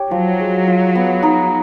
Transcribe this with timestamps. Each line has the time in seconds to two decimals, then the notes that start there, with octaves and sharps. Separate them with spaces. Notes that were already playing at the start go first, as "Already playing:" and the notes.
Already playing: G4 C#5
0.11 F3 F#3
0.40 G#3
0.67 F4
0.95 B3
1.23 D#4